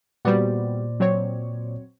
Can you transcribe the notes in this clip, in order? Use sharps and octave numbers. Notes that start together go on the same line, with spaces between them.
A#2 G3 B3 F#4 C5 D5
F#3 C4 C#5